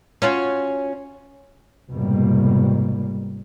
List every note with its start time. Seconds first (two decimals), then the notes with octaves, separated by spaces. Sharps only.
0.22 C#4 F4 F#4
1.90 F1 G#2 B2 G3 A#3